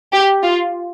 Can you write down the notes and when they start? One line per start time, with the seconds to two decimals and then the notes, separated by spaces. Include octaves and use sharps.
0.13 G4
0.43 F4